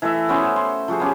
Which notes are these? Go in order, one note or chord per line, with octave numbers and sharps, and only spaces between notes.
E3 A3 E5
B3 C#4 F#4 C5
C6
F3 F#4 G#4 C5
B3 C#4 G4